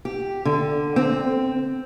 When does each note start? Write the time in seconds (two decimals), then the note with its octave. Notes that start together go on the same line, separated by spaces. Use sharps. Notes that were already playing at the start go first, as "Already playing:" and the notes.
0.05 G4
0.45 D3
0.96 C4